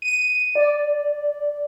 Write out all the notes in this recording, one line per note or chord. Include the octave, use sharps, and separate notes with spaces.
D#7
D5